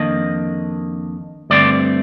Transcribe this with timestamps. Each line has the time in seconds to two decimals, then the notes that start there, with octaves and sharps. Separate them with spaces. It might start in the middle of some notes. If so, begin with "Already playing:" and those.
Already playing: F2 D#3 A#3 D4 D#5
1.50 G2 D3 A3 C4 D5